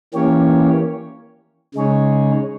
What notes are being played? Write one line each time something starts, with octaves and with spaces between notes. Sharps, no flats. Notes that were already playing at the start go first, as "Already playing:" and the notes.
E3 A#3 C#4 G4 C#5
C#3 G#3 D#4 G#4 C#5